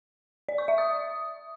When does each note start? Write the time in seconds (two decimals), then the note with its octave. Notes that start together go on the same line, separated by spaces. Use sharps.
0.49 D5
0.58 C#6
0.68 E5
0.78 D#6